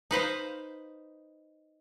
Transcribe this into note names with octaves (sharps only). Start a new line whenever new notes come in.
D#4 B4 C5 F5